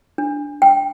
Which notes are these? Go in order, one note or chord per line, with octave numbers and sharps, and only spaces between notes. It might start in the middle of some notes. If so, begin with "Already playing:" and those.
D4
G5